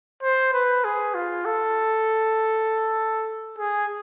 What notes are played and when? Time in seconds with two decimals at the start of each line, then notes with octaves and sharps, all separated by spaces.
0.23 C5
0.53 B4
0.84 G#4
1.15 F4
1.45 A4
3.58 G#4